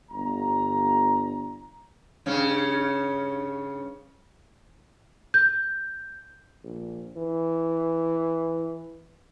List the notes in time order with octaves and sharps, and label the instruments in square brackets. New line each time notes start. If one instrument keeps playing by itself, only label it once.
[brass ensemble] G1 A#5
[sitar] G2 C#3 C#4
[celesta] G6
[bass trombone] A#1
E3